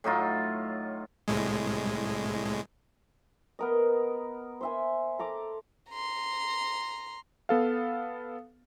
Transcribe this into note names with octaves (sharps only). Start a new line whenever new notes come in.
A2 F#3 D#4 F4
C2 A2 G#3
B3 A#4 D#5
C5 E5 G#5
A4 A#5 D6
A#5 C6
B3 A4 F5